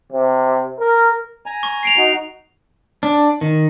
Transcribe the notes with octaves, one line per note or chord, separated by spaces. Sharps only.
C3
A#4
G#5 A#5
C#6
C7 D7 F7
D#4 F#4
D4
D#3